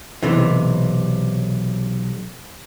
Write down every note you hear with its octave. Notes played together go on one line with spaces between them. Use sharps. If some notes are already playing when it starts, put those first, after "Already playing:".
B1 C3 E3